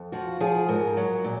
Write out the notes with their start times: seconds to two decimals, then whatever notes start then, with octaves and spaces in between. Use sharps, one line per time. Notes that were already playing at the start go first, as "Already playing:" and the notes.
Already playing: F2
0.12 F3 F#4
0.40 F3 G#4
0.69 G#2 A#4
0.97 F#3
1.24 A#2